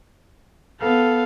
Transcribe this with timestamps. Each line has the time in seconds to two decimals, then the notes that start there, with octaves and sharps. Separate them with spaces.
0.80 B3 A4 F5